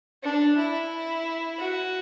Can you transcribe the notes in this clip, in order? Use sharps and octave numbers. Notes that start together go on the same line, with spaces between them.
D4
E4
F#4